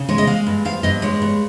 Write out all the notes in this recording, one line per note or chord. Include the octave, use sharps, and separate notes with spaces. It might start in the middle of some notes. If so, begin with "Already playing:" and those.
Already playing: C#3
G#3 C#5
D#5
G#3 F5
G2
F3 F5
G2 D#5
G#3 C#5
G2